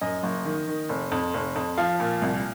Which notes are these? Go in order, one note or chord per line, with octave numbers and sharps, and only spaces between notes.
F#2 D#5
F#1
D#3
D#3
F1
F2
F1
F2
F3 F5
A#2
C2